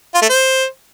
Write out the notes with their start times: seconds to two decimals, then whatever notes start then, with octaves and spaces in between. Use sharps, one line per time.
0.14 F4
0.22 A3
0.29 C5